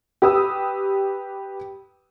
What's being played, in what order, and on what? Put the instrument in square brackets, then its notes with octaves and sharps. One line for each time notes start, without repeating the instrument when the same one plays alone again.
[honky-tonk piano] G4 B4 D#6 E6